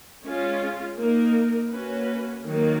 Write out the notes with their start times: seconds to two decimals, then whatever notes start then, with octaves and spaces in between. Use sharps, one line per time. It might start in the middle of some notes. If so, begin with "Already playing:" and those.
0.23 G#3 C#4 F4
0.96 A#3 D#4 A#4
1.70 A#3 C#4 F#4 B4
2.44 D#3 F#3 A#3